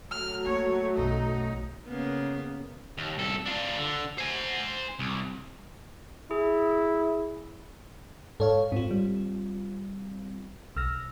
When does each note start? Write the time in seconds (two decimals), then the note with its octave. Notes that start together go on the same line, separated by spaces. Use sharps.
0.11 F#3 A3 F6
0.46 A#3 C#5
0.97 B1 F#2 D#4
1.87 C#3 A#3 B3
2.98 D#2
3.18 C2 A4
3.46 D4 F4
3.79 D3
4.18 C5 G#5
4.99 C2
6.31 E4 G#4
8.40 G#2 A4 C#5 F5
8.72 G#2 C4 F4
8.91 G3
10.76 B1 E6 F6 A#6